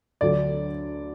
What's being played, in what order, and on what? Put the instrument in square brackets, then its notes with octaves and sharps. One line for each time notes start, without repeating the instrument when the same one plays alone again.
[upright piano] D2 D3 F#3 D5